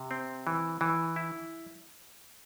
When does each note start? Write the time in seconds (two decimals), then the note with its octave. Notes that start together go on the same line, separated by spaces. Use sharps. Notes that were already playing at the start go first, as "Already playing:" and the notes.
Already playing: C3
0.11 C4
0.47 E3
0.81 E3
1.16 E4